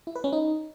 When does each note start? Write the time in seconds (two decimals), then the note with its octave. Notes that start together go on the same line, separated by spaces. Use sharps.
0.07 E4
0.16 B4
0.24 C#4
0.33 D#4